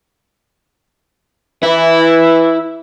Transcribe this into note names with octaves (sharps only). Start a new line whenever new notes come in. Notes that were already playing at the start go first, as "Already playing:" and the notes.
E3 E4